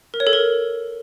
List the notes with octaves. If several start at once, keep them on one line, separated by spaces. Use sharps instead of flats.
A#4
C#5
A4
A#4